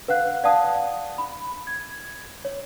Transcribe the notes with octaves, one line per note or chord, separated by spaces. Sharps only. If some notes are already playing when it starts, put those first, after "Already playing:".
B4 F5 F#5 F#6
D5 F5 F#5 A5 D#6
B5
G#6
C#5